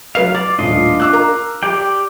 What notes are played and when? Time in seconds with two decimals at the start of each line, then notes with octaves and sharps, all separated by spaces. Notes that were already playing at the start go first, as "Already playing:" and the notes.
0.15 F#3 B4 F5 C7
0.35 D5 A6
0.59 D#1 A2 D4 F4 D#5
1.00 D6 E6 F#6
1.13 A#4 A#5
1.63 G4 D5 G5